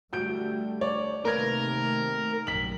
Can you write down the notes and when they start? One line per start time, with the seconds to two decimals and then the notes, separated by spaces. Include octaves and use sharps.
0.13 D3 G3 A3 F#4 G6 D7
0.81 C#5 D5
1.25 C3 D#3 A3 A#3 A#4 B4 G#6
2.47 A#1 F#2 G3 B6 F#7